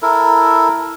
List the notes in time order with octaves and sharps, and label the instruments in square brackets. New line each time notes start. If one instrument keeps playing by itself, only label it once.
[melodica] E4 A4 A#4